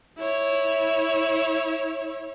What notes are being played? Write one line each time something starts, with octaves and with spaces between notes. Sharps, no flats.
E4 C#5